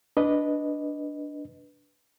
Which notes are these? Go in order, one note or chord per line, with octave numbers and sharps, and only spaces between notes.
D4 B4 D#5